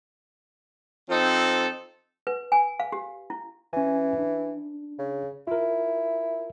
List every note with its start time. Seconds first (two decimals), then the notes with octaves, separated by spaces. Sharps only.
1.09 F3 C4 D#4 A4
2.27 B4
2.52 G#5
2.80 F5
2.92 G4
3.30 E4
3.73 E3 C#4 G#5
4.18 D4
4.99 C#3
5.47 E4 F4 A#4